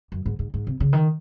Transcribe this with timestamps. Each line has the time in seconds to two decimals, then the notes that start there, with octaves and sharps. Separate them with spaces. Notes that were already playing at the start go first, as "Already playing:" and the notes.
0.12 F#2
0.26 G#2
0.39 G#2
0.54 G#2
0.67 C3
0.80 C#3
0.93 D#3